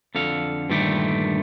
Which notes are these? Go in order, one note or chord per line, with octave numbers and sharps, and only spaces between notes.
F2 D3 A4 F5
G2 A#2 D3 D#3 A3 G4